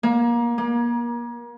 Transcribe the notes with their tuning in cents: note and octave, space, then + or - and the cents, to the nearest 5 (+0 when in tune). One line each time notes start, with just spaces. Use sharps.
A#3 +25
A#3 +35